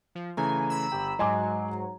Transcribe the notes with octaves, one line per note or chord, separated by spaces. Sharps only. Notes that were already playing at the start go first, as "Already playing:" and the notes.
F3
C#3 E3 A3 G#5 A#5
B5 E6
G1 G4 G5
G#2 F#3 G#3 D#5 G#5 C6 D6